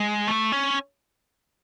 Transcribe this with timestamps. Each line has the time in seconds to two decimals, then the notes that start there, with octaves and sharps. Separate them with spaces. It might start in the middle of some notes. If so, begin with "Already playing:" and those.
Already playing: G#3
0.27 A3
0.52 C#4